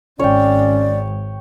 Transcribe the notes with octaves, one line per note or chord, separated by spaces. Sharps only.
G#1 C#4 C#5 D5 G5